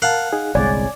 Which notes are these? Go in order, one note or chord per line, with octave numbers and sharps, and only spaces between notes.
A#4 F5 F#5 A5
D#4 G#4
G1 C2 G#3 C#5 D5 G#5 G#6